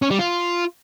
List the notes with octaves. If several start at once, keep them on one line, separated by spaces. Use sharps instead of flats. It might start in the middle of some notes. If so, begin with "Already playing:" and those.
C#4
G3
F4